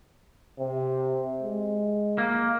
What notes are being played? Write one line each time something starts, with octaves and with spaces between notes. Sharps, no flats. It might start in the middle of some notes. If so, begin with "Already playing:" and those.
C3
G#3
A#3